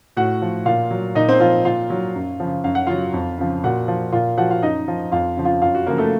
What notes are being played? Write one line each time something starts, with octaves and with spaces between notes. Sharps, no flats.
A2 F#4 F#5
F3
A#2 F4 F5
F#3
A#2 D#4 D#5
C4 C5
F3 F4 F5
A#2 F4 F5
F#3
F#2
C#3 F3
F#2 F5
F#5
C#3 F#3 F4 F5
F2
C#3 F3
A#2 F#4 F#5
F3
A#2 F4 F5
F3 F#4 F#5
F4 F5
F#2 D#4 D#5
F3
F2 F4 F5
C#3 F3
F4 F5
F#2 F4 F5
F#4
C#3 F3 A#3 A#4
A3 A4